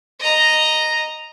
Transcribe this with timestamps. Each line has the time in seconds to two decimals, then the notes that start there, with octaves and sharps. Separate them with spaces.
0.20 D#5 A#5